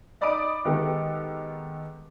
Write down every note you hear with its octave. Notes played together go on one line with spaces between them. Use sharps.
D#4 D5 B5 D6 D#6 D7
D#3 G#3 B3 G4 A4